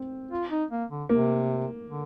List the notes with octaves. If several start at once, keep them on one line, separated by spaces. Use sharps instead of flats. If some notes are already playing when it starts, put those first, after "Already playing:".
Already playing: C4
F4
D#4
A#3
D3
C3 A#3
D3